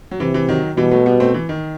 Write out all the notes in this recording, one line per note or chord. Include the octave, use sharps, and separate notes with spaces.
F#3
C3 E3
E3
D#3 F#3
B2 E3 G3
F#3 A3
G3 B3
A3 C4
E3
D#3